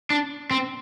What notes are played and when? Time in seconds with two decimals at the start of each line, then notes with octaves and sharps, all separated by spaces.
0.10 D4
0.51 C4